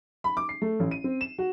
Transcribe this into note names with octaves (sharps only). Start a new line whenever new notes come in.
B5
D6
C7
A3
A1
D#7
C4
E7
F#4